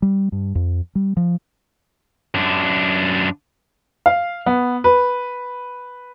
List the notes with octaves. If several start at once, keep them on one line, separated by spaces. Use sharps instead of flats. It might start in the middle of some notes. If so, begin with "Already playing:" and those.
G3
G2
F2
G3
F3
F#2 D4
F5
B3
B4